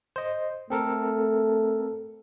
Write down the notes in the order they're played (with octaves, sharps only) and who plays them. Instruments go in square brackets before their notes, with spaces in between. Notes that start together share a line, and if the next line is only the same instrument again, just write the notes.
[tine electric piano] C5 D#5
[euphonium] A3 [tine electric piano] C4 A4 A#4